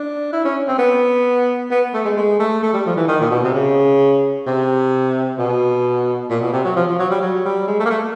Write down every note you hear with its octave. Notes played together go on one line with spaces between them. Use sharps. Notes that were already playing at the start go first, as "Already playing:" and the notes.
Already playing: D4
E4
C#4
C4
B3
B3
A3
G#3
G#3
A3
A3
G3
F3
E3
D#3
A#2
B2
C3
C#3
C3
B2
A#2
B2
C3
F#3
F3
F3
F#3
G3
F#3
G3
G#3
A3
A#3
A3